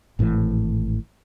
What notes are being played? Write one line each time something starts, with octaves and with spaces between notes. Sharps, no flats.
G#1 A2 C3 E3